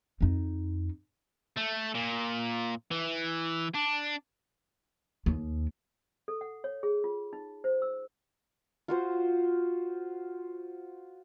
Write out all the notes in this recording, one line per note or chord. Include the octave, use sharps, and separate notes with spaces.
F2 D#4
A3
A#2
E3
D4
D#2
A4
F#5
C#5
G#4
F4
D#4
C5
E6
F4 F#4 C5